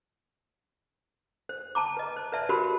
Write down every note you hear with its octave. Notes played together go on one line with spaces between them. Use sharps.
C5
A5 A#5 D6
B4 D#5
C5 A5
B4 D5 E5 A5
F#4 G4 A#4 C5 B5